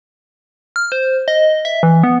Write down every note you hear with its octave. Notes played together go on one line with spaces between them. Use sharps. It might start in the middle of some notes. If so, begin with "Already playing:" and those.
F6
C5
D#5
E5
E3
B3